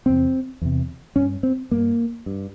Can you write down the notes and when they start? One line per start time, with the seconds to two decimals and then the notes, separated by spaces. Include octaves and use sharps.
0.06 E2 C3 C4
0.62 E2 C3
1.16 G2 C#4
1.43 C4
1.71 G2 A#3
2.26 G2